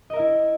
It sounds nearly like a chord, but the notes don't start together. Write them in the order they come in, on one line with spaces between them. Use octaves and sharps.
D#5 A#4 E5 E4